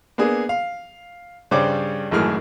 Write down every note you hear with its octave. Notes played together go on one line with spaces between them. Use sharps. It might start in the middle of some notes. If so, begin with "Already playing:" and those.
A#3 B3 D4 G#4
F5
G2 C#3 G3 C5 C#5 D6
G#1 F#2 A2 E3 G#4 F6